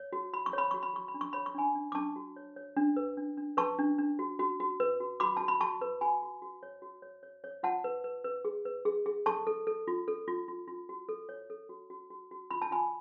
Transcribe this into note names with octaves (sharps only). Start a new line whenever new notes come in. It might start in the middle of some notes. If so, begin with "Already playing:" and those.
Already playing: C#5
F#4
F#4 B5
C#6
C#5 B5
F#4 C#6
B5
F#4 C#6
B5
D4
C#6
C#5 B5
C#6
D4 G#5 B5
D4
D6
D4 A5 C#6
F#4
C#5
C#5
D4
B4
D4
D4
B4 A5 C#6
D4
D4
F#4
F#4
F#4
B4
F#4
F#4 B5 D6
F#4 A5
B5
F#4 A5 C#6
B4
F#4 G#5 B5
F#4
F#4
C#5
F#4
C#5
C#5
C#5
F4 F#5 A5
B4
B4
B4
G#4
B4
G#4
G#4
A4 A5 C#6
A4
A4
F4
A4
F4
F4
F4
F#4
A4
C#5
A4
F#4
F#4
F#4
F#4
F4 B5
A5
F4 G#5 B5